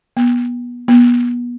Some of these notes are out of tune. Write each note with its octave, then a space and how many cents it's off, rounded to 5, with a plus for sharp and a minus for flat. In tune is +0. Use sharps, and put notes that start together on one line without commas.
B3 -25
B3 -30